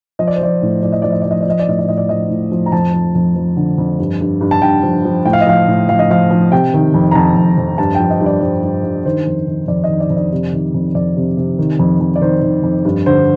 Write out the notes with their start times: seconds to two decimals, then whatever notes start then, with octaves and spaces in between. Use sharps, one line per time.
0.19 F3 D#5
0.27 D5
0.36 C5
0.41 F3 D5
0.62 A2
0.83 F3 D5
0.92 D#5
1.02 F3 D5
1.12 D#5
1.22 F3 D5
1.31 D#5
1.41 D5
1.46 F3 D#5
1.59 D5
1.68 A2 D#5
1.79 D5
1.88 A2 D#5
1.98 D5
2.09 F3 D#5
2.30 A2
2.52 F3
2.66 A#5
2.72 F2 A5
2.94 F3
3.15 F2
3.36 F3
3.57 D3
3.78 F2
3.99 G2
4.21 G2
4.41 G2
4.51 A5
4.62 G2 G5
4.83 F3
5.05 F3
5.25 A2 G5
5.33 F5
5.41 D#5
5.47 F3 F5
5.67 A2
5.89 F3 F5
5.99 D#5
6.11 F3 F5
6.31 F3
6.52 C3 G5
6.74 D#3
6.94 F2
7.11 A#5
7.15 F2 A5
7.36 F2
7.58 F2
7.78 G2 A5
7.95 F3 G5
8.10 D#5
8.21 G2
8.26 D5
8.41 G2 C5
8.63 G2
8.84 G2
9.06 D#3 C5
9.27 F2
9.47 D#3
9.68 F2 D5
9.84 D#5
9.89 D#3
10.00 D5
10.10 F2
10.17 D5
10.32 C3
10.53 D#3
10.74 F2
10.95 F2 D5
11.16 C3
11.37 C3
11.59 D#3
11.79 F2
12.01 F2
12.16 D5
12.21 D#3 C5
12.42 D#3
12.63 F2
12.85 G2
13.06 D3 C5